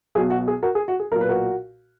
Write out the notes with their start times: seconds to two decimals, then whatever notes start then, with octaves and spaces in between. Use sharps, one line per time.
0.15 B1 B2 G#4
0.30 F#4
0.48 G#4
0.63 F#4 A#4
0.75 G#4
0.88 F#4
1.00 G#4
1.11 B1 A#2 A#4
1.21 B4
1.29 F#4 A#4